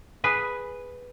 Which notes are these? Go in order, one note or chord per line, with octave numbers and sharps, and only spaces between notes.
G#4 B4 G#5